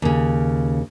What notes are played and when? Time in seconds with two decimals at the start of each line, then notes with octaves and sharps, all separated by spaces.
0.02 D#2 C#3